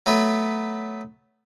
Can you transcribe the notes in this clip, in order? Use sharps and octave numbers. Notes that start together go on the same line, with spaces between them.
F#3 A3 B3 B4